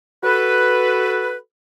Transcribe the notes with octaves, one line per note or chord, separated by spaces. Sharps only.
F#4 A4 B4